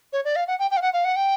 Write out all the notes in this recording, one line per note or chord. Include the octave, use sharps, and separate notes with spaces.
C#5
D5
F5
F#5
G5
G5
F5
F#5
F5
F#5
G5